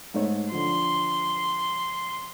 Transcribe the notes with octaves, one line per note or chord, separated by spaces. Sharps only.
G#2 A3 C#5
D3 F3 C6